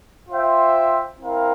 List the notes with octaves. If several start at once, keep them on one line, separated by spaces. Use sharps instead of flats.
F4 C5 E5 G5
C4 E4 A#4 F5